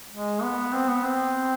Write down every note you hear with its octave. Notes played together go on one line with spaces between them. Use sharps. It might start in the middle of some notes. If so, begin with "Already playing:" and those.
G#3
B3
C4
B3
C4